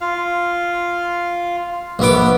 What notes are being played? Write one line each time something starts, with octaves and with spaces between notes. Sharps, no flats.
F4 F5
A#1 B3 D6